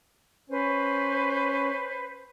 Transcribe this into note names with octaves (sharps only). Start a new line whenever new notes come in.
C#4 B4 C5